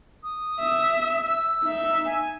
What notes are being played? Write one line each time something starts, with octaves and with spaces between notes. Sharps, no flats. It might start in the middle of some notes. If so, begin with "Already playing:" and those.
D#6
E5
E6
D#4 E5
G#5